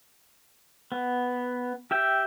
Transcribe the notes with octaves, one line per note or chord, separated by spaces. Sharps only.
B3
G4 E5 G5